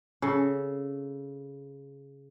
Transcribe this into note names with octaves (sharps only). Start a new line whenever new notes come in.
C#3 A4